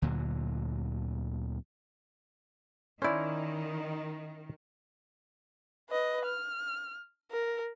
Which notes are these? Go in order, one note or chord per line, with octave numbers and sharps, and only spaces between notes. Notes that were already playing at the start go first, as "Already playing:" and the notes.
D2 A#2 D3 F#3
D#3 C#4 E4 C5 D5
B4 D#5
F6
A#4